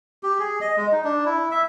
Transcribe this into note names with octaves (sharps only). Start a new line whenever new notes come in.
G4
G#4
D#5
G#3
D#4
D4
E4
E5